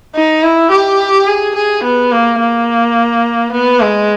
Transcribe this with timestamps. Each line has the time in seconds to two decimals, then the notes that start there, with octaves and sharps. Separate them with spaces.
0.15 D#4
0.43 E4
0.71 G4
1.27 G#4
1.56 G#4
1.83 B3
2.12 A#3
2.40 A#3
3.52 B3
3.80 G#3